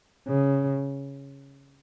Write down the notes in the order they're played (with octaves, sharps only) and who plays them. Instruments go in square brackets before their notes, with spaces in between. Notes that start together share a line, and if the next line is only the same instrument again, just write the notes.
[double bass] C#3